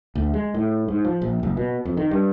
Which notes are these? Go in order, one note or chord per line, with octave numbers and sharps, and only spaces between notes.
D2
G#3
A2
G#2
F3
A#1
F#1
B2
F2
D#3
G2